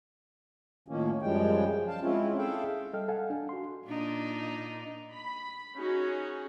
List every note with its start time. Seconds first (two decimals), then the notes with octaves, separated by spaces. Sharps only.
0.88 A2 D#3 F3 A#3 C#4
1.22 F#2 C#3 F3 G3 G#3 G5
1.88 F5 A5
2.02 G#3 C4 C#4 E4 F4
2.38 G#4 A4 E5 F5 G5
2.93 G3 A4 D#5 G5 F6
3.08 A4 F5 F#5 G#5
3.30 D4
3.49 F#4 C6
3.87 A#2 D4 D#4
5.13 B5
5.78 C#4 D#4 F#4 G#4